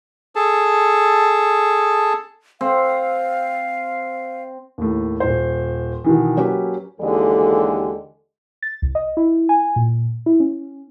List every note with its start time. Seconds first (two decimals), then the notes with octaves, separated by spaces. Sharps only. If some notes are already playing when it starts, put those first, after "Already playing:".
0.36 G#4 A4 A5
2.61 C4 F5
4.78 D#2 A2
5.20 D#1 C5
6.04 B2 D#3 E3
6.37 F#3 A#3 C#4 G4 B4
7.00 D#2 D3 E3 G#3 G4 A4
8.63 A6
8.82 C2
8.95 D#5
9.17 E4
9.49 G#5
9.76 A#2
10.26 E4
10.40 C#4